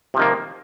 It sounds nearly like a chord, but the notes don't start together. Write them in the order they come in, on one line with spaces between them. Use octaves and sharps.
C3 F3 D#3 A#3